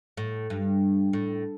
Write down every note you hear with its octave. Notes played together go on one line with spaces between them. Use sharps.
A2
G2
A2